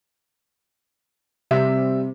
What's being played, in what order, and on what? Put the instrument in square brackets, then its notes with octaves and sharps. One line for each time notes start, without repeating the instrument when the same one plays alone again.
[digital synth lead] C3 [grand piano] G3 E5